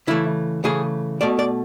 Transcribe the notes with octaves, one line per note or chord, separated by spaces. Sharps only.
C#3 E3 A3 E4
C#3 E3 A3 G#4
B2 A3 D5
D5